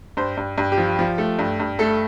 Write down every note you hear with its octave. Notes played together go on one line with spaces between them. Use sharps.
G2 C5
G2
G2
G4
F3
F3
A3
G2
G2
A3 A4